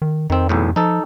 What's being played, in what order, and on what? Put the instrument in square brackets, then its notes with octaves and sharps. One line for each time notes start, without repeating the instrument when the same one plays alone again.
[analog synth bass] D#3
[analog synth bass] F2 [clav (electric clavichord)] D#3 C4
[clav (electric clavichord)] B1 E2 A2
[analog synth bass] F3 [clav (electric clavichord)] D#4 A4